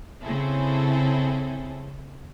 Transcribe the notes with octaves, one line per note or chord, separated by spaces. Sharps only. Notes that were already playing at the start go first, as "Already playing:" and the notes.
C#3 C4 E4 G#4 A4